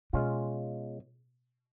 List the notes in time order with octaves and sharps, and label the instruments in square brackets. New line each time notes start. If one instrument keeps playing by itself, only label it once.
[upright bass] B2 [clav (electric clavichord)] G#3 C#4 F4